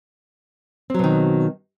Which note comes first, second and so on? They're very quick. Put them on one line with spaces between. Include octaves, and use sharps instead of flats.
C4 F#3 B2 D#3